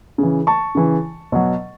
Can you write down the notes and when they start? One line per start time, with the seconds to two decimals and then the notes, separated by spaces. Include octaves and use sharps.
0.18 C#3 E3
0.47 A5 C#6
0.75 C#3 E3
1.32 B2 F#3